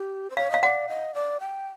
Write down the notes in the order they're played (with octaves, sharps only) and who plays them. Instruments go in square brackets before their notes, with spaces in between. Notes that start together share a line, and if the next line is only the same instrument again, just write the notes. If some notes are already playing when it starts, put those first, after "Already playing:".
Already playing: [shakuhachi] G4
C5
[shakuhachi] C#5 [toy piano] F5
[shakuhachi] D#5 [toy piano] F5
[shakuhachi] D5 [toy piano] F#5
[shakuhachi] D#5
D5
G5